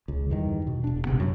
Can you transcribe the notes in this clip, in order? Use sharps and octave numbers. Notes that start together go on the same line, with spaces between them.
C#2
E2 G2 D#3
B2
E1 D4
G#1 G#2 C3 B3
F#2 F#3